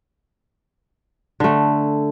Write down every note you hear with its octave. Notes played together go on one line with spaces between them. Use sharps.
D3 A3